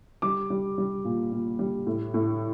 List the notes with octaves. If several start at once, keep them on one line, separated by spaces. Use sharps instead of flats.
G3 D6
G3
G3
A#2
A#2
G3
A2
A2